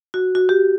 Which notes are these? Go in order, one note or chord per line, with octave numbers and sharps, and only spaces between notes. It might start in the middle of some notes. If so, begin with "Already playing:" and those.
F#4
F#4
G4